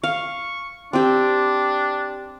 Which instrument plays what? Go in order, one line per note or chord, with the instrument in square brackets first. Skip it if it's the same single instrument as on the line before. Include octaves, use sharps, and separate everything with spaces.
[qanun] F5 [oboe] C#6
[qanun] C4 G4 [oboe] D4